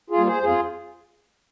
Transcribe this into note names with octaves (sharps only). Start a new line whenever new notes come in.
F4 G#4
G3 A#3
G#4 C5
F2 F4 G#4